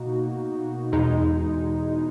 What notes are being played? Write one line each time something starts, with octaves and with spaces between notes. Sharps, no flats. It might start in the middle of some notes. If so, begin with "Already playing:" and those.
Already playing: B2 A#3 D#4 F#4
E2 B2 G#3 D#4